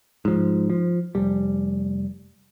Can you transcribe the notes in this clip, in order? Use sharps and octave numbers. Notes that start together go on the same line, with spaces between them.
G#2 F3
F3
F1 G3